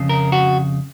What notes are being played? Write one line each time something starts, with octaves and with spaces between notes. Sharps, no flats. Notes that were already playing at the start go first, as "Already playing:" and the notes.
Already playing: F2 C#3
A#4
F#4